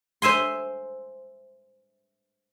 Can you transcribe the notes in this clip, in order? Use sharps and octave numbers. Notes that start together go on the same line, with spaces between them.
C5 E5 G#5 C6